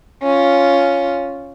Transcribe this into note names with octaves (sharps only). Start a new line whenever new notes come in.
C#4 F4